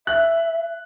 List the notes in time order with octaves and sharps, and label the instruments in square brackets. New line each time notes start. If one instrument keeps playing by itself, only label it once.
[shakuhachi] E5 [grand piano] F#6